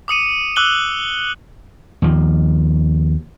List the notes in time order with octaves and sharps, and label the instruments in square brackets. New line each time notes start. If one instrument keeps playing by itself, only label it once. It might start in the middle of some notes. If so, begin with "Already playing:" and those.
[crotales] D6 D#6 C#7 D#7
D6 E6 F#6 F#7 G7
[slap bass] D#2 F3